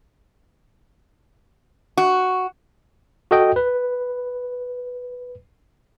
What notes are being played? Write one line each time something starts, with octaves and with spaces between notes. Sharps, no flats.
F#4
F#4 A4 D#5 G5
B4